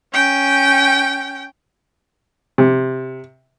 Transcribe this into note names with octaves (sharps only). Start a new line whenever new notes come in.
C#4 G5
C3